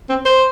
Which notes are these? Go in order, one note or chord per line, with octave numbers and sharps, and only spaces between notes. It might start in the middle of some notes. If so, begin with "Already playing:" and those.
C4
C5